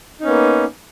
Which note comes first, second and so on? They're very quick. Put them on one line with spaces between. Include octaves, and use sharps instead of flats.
D#4 C#4 B3 A#3